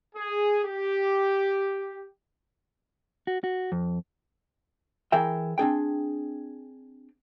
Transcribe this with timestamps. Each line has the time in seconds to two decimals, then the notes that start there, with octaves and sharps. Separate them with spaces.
0.15 G#4
0.65 G4
3.27 F#4
3.44 F#4
3.72 F2
5.12 E3 G#4 A#4 E5 G5
5.58 C4 D4 G#4 G5